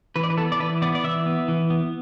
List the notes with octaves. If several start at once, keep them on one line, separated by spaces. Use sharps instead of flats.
E3 B4
D5
B4
B3 A4
D5
E3 B4
B3 D5
D5
E3 E5
B3
E3
B3